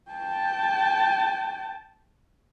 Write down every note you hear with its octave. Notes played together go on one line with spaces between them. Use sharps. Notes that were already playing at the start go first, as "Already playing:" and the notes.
G5 A5